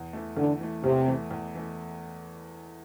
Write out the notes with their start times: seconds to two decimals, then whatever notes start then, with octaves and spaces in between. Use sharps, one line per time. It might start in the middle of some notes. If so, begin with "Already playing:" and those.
Already playing: E2
0.13 E3 A3
0.37 E2 D3
0.61 E3 A3
0.84 E2 C3
1.08 E3 A3
1.31 E2
1.55 E3 A3